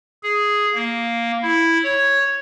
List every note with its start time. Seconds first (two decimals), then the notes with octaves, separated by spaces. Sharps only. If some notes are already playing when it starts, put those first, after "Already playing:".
0.23 G#4
0.74 A#3
1.43 E4
1.83 C#5